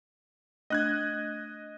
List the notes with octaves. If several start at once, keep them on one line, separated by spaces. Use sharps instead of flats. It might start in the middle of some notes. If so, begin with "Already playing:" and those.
A3 D4 D#5 F#6 G#6